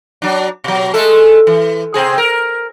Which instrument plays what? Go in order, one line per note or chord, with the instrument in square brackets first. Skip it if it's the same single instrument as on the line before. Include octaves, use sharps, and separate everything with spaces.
[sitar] F#3 D4
B2 F#3
G#3 A3 A4
E3
C3 C4 G#4
A#4